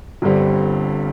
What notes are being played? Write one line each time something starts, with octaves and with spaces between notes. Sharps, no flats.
G1 G2 D3 G3 C4